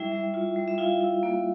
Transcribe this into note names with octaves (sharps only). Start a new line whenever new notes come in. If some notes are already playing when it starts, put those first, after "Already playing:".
Already playing: G3 E4 E5
G3
F4
G3
E5
E4 F4 F5
E4
A#3